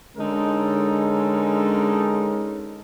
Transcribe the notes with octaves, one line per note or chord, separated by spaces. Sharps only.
D3 G#3 C#4 D#4 A4 A#4